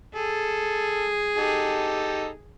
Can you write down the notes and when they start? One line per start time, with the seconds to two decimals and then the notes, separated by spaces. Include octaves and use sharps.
0.15 G#4 A4
1.37 D#4 G4 A4